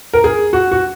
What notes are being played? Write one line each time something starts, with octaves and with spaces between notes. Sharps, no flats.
A#4
G#4
F#4
F#4